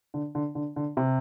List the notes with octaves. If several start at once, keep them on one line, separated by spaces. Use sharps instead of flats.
D3
D3
D3
D3
C3